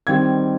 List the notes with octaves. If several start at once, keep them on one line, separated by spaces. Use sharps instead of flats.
D#3 G3 C4 G#6